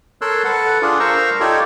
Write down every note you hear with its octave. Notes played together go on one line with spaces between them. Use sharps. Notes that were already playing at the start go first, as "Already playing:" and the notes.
A4 A#4 C#5 C6 E6 F#6
A4 B4 F#5
D4 F4 G#4
A#4 C5 F5 A#5 C#6 E6
D#4 F4 G4 A4 C#5 D5